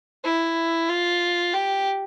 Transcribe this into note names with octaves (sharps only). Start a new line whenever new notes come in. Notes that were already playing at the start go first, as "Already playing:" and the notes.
E4
F4
G4